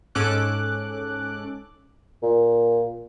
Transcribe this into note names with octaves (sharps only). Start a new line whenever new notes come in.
G#2 C#4 A4 D6 F#6
A#2